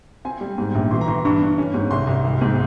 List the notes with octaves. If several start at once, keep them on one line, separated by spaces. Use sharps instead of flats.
C4 G#5
G3
G#2
A#1
E3 C6
A#5
E3 C6
G2 C#6
G2
C#4
G#2
C2 C6
C2
G#1
G#2